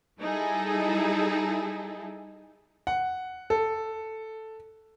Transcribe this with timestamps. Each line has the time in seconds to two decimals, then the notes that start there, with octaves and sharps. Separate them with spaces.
0.21 G3 D#4 E4 G#4 A4
2.87 F#5
3.50 A4